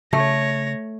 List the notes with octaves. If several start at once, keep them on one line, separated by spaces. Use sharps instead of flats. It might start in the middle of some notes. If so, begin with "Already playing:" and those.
C#3 A3 C#5 A#6